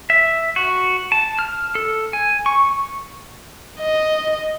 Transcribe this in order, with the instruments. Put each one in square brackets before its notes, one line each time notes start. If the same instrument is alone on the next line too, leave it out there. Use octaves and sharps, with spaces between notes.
[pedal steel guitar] E5
F#4
A5
F6
A4
G#5
C#6
[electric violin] D#5